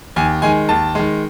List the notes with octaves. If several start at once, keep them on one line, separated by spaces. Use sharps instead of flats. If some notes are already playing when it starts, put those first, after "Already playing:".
D#2 G#5
D#3 G#3 G#5
D#2 A5
D#3 G#3